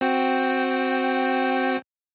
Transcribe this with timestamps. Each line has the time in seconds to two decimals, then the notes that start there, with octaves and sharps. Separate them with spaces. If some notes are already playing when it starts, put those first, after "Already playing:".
0.01 C4 F#4 G5